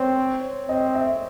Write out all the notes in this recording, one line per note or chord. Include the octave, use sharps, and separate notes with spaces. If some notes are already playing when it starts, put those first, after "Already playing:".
Already playing: C4 C#5
C4 D#5
E5